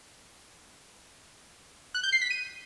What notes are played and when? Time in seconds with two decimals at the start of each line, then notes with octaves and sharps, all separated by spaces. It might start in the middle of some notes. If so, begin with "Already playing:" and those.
1.95 F#6
2.03 G6
2.12 C7
2.21 B6
2.30 D#7